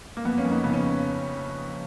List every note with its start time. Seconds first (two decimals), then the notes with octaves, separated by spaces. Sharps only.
0.17 A#3
0.25 F2 B3
0.38 A#3 C#4
0.45 F2
0.51 B3 D#4
0.64 C#3 B3
0.73 C#4